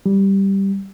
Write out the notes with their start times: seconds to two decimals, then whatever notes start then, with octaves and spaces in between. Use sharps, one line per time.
0.06 G3